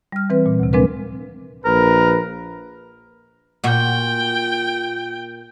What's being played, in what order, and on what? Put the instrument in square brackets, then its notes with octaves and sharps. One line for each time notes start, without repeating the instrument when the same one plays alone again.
[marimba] G3 F6
E3 C4 B4
A#2
D2 C3
F3 G#3 C4 D4 A#4 B4
[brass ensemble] A#1 B4 [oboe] A#4
[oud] A#2 F#4 [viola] G5